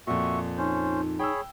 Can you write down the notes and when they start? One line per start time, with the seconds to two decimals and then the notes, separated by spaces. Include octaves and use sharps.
0.07 F2 A#2 F#4 E5 C#6
0.57 C#4 D#4 C5
1.19 G#4 C#5 G5 B5 E6